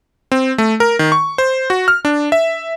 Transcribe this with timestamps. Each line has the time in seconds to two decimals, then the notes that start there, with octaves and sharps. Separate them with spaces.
0.32 C4
0.58 A3
0.80 A#4
0.99 D#3
1.12 C#6
1.38 C5
1.70 F#4
1.88 F6
2.05 D4
2.32 E5